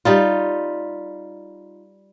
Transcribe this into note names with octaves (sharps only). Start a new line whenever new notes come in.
G3 D#4 F4